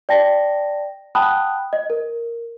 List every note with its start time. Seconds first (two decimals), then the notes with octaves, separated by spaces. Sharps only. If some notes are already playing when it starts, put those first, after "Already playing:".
0.09 D5 G5 A5 A#6
1.15 F#5 G5 A5 B5 D#6 F#6
1.73 D#5
1.90 A#4